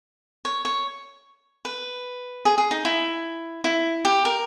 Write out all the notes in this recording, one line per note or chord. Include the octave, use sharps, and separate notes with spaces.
C#5
C#5
B4
G#4
G#4
D#4
E4
E4
G4
A#4